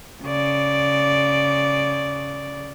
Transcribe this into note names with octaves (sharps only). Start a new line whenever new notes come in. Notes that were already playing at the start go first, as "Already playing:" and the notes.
C#3 D5